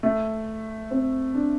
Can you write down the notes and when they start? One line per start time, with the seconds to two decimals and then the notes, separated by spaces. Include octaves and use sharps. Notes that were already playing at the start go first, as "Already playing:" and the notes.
0.03 A3
0.91 C4
1.34 D4